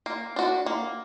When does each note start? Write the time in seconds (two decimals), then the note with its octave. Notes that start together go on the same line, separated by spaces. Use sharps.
0.06 A#3
0.36 D4 F#4
0.66 A#3